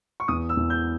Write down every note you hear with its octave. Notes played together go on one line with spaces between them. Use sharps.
C#6
E2 D#6
E6
E2
G6